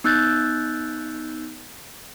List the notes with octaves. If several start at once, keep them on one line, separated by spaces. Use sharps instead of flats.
B3 D#4 E6 F#6 G6 A6